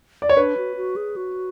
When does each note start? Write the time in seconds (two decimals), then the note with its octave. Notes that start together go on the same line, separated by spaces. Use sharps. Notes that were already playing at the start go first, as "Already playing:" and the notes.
0.22 D5
0.29 C#5
0.36 D4 B4
0.57 F#4
0.77 F#4
0.96 G#4
1.16 F#4